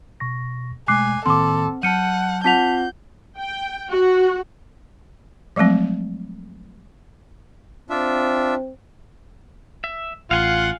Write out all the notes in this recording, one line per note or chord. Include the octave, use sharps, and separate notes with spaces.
B2 C#6 A#6
B2 G#3 A3 G#5 D6 F#6 C7
A2 D#3 A#3 C4 A4 C6 D6
F#3 F#5 A5 F6 G6 C#7 D#7
C4 F4 F#5 A5 G6 B6 F7
G5
F#4
F3 F#3 G#3 A3 C4
C4 D4 F4 E5
E5
A1 F4 F5 F#5 G#5 C6